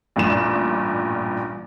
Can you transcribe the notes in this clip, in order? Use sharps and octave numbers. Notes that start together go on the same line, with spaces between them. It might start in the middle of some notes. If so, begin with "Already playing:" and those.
A1 G2 A#2 E7